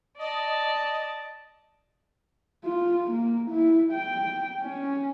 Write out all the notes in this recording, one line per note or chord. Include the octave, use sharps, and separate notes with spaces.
D5 D#5 A5
F4
A#3
E4
G5
C#4